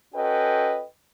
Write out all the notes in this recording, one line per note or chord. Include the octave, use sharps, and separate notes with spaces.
C#4 F#4 A4 B4 D#5 G5